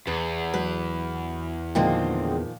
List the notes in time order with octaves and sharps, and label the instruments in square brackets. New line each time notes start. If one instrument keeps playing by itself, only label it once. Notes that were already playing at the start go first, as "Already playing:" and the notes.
[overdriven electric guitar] E2 [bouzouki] B4
[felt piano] F#3 [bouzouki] B4
[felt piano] A#2 D#3 F3 [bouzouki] D3 G#3 C4